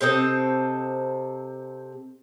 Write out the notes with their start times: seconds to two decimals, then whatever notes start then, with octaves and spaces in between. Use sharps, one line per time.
0.01 C3 C4 A4 D#5